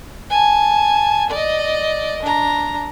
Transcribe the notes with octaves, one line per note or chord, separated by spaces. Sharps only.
G#5 A5
D5 D#5
D4 A#5